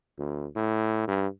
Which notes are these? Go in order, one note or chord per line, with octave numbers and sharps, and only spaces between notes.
D2
A2
G2